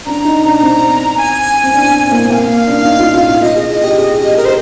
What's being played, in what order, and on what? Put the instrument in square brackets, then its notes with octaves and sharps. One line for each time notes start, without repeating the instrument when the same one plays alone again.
[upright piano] D4 [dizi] A#5
[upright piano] D#4
D4
C4
[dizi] G#5
[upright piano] C4
D4
C4
A#3
[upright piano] A#3 [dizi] F5 G#5
[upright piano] D4
D4
D#4
F4
F4
F4
[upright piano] F4 [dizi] D#5
[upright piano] G#4
G4
G#4
G4
[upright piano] G4 [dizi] A#4
[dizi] C5